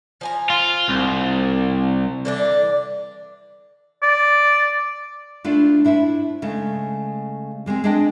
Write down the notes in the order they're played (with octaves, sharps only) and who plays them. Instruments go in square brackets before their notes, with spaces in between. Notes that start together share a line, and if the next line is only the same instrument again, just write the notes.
[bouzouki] F3 G#5 A#5
[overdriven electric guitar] F4
C2
[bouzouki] D3 E3 D4
[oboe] D5
[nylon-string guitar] A3 D4 E4 F4 D5 F5
D4 E4 C5 E5
C#3 G#3 A3
G3 G#3 A#3 C4
G#3 D4 G#4 D#5 G5 A5